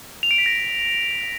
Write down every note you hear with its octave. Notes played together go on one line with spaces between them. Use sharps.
F7
D7
B6
A#6